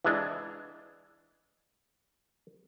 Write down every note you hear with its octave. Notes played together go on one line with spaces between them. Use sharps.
E3 G#3 D4